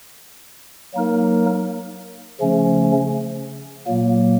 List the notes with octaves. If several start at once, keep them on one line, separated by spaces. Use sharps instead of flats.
F#3 A#3 D#4 A#4
C#3 F3 A3 C#4
A#2 F#3 A#3